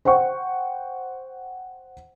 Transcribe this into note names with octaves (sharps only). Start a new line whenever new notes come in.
C5 F#5 G5 C#6